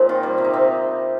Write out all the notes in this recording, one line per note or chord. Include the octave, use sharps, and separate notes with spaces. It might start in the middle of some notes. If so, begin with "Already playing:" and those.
Already playing: A#2 F3 C4 D#4
D#3 F4
G3
C3
D#4
C3 C4